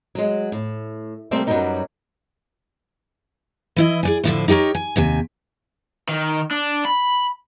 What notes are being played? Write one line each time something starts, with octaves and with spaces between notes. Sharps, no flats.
F#3 G#3
A2
C3 G3 A3 A#3 C4
F#2 F#3 G3 B3 C4 D#4
E3 E4 D#5
G#4 D5 G#5
A2 D3 F3 D#4 E4 C5
D#4 G4 A4 A#4 C#5
G#5
D#2 C3 G#5
D#3
D4
B5